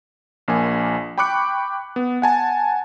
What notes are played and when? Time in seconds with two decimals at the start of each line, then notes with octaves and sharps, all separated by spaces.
0.48 A#1 A#3 G#5
1.18 G5 B5 C#6 D6 F#6 C#7
1.96 B3
2.22 F#5 G#5 A5